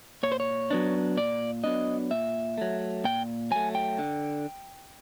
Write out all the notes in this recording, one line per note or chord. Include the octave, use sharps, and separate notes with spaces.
A#2 C#5
C5
C#5
F#3 B3 D4
A#2 D5
F#3 B3 D4 D#5
A#2 E5
F#3 A3
A#2 G5
F#3 A3 G#5
G5
D3